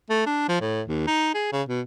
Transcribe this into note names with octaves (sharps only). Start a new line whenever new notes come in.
A3
D4
F3
A2
D#2
D#4
G#4
C#3
B2